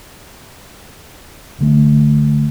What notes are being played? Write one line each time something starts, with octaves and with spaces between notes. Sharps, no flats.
C2 D3 A3